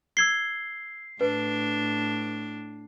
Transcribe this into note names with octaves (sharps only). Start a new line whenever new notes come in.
E6 G#6 C7 G7
A2 D4 B4